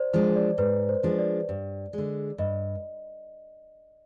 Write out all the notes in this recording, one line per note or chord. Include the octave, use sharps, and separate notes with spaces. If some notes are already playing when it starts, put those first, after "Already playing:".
Already playing: C5 D5
F3 G#3 D4 C5
D5
G#2 B4
C5
F3 G#3 D4
D5
G2
D3 G#3
G2 D#5